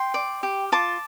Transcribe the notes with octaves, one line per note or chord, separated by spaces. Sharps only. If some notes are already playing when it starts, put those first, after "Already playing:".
Already playing: G5 C6
D5
G4
F4 A5 D6